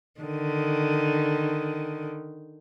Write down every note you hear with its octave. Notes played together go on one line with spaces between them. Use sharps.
D3 D#3